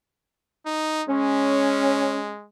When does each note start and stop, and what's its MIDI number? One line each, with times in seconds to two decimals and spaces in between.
0.66 1.03 63
1.09 2.47 56
1.09 2.32 61